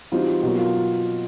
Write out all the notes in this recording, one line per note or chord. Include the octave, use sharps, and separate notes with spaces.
E3 G3 C4 D#4 F4 F#4
B2 F#3 A#3 F#4
F4